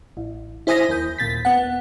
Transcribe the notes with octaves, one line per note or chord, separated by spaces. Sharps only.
A1
E4 C5 G#5 D#6 A#6 B6
D#2 G6
D#2 A#2 A6 B6
B3 F#5